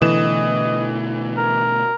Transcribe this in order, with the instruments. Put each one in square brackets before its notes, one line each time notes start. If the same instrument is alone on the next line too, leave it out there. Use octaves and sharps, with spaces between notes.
[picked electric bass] B2 D3 A3 [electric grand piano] E3 E7 [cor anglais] D#5
[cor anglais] A#4